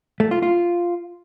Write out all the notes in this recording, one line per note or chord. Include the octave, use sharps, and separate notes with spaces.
A3
F4
F4